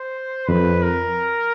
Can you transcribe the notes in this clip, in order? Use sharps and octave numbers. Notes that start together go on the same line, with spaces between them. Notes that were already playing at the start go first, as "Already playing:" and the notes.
Already playing: C5
F2 B4
A#4